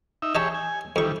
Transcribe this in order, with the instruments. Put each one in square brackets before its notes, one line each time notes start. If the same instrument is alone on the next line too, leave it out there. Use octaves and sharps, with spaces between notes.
[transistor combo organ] D#4 E5
[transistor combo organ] G4 G#4 C#5 [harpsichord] D#5 E5 A5
[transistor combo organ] G#5
[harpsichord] F2 C#6 [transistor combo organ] D#3 E3 G3